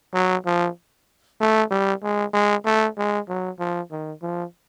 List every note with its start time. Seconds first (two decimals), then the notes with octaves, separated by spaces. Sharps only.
0.14 F#3
0.46 F3
1.40 A3
1.71 G3
2.03 G#3
2.34 G#3
2.66 A3
2.98 G#3
3.28 F#3
3.59 F3
3.91 D#3
4.22 F3